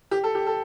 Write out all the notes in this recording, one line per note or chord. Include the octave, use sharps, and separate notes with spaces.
G4
A4
G4
A4